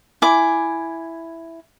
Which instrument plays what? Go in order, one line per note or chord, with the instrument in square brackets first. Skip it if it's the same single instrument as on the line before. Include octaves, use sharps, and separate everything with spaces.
[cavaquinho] E4 G#5 D6